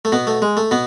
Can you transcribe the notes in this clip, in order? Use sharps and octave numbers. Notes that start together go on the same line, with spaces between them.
A3
B2 B3
A3
G#3
A3
B2 B3